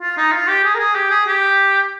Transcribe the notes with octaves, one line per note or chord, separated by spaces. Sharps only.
F4
D#4
F4
G4
G#4
A#4
G#4
G4
G#4
G4